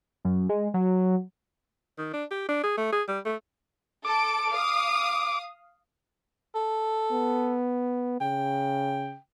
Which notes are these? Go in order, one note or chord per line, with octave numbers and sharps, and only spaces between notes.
F#2
G#3
F#3
D#3
D4
G4
D4
G#4
A3
G#4
G3
A3
A4 D6 D7
F5 D#6
A4
B3
C#3 G5